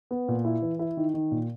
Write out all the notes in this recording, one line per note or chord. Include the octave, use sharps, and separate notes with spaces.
B3
A#2
E4
E3
E4
D#3
D#3
A#2